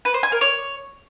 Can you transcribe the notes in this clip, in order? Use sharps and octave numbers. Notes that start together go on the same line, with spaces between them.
B4
C5
G#5
A#4
C#5